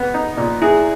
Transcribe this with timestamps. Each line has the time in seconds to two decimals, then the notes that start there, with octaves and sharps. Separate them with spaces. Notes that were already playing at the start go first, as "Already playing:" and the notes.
Already playing: B3
0.14 D#4
0.37 A#2
0.62 E4 G#4